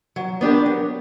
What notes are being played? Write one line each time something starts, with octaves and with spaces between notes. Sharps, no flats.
F#3
B3 D4 G4 A#4
F#3